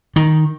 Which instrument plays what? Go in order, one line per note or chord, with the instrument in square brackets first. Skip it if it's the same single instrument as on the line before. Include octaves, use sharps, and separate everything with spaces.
[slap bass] D#3